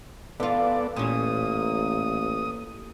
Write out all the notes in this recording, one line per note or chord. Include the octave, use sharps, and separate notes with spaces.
E3 B3 F4 A4 D5
A1 A#2 C#4 D#6